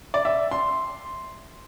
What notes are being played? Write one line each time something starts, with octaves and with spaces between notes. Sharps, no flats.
D5
E5
C6